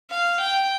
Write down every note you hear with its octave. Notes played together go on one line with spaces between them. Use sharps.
F5
G5